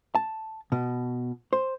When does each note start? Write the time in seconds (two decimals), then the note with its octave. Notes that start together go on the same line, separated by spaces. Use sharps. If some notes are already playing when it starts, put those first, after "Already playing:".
0.15 A5
0.72 B2
1.53 C5